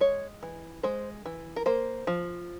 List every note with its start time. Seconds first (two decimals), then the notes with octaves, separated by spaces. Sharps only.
0.01 G#3 C#5
0.43 E3
0.83 G#3 C5
1.26 E3
1.56 A#4
1.66 A#3 C5
2.07 F3